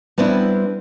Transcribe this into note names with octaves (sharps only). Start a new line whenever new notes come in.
G3 B3 C4 D4 E4